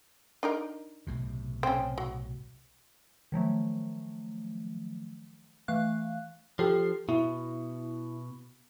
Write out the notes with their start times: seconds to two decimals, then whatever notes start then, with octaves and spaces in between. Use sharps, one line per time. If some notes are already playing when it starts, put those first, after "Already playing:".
0.43 D4 D#4 A#4
1.07 B1 A2 C3
1.63 C4 C#4
1.98 F#3
3.32 D#3 F3 F#3 A3
5.68 E3 A3 F5 F#6
6.59 F3 G4 A4 C7
7.09 B2 E4